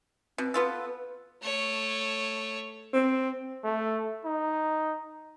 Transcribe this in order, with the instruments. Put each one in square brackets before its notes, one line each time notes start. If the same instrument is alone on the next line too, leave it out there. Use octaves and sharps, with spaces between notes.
[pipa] B2 [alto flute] C4
[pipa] B3 F4 A4 [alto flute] B4
[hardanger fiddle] A3 C#5
[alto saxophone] C4
[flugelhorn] A3
D#4